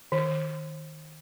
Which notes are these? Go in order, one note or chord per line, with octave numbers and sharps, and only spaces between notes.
D#3